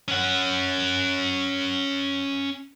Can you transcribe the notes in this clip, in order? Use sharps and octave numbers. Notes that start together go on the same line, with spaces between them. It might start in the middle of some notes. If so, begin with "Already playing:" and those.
C#4 F#5